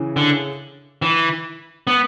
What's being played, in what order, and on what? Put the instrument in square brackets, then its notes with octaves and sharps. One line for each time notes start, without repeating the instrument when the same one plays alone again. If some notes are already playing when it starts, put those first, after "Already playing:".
Already playing: [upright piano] C#3 E3
[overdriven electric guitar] D3
E3
B3